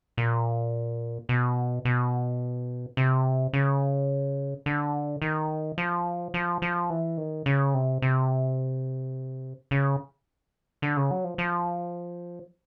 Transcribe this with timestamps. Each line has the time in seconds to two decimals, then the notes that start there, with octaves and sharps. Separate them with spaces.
0.17 A#2
1.29 B2
1.85 B2
2.97 C3
3.53 C#3
4.66 D3
5.22 D#3
5.78 F3
6.34 F3
6.62 F3
6.90 E3
7.18 D#3
7.46 C#3
7.74 C3
8.02 C3
9.71 C#3
10.82 D3
10.97 C#3
11.11 F#3
11.24 F3
11.38 F3